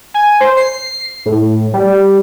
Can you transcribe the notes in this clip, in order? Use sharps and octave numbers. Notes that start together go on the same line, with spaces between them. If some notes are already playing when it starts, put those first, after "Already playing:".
G#5
C5
C7
A2
G3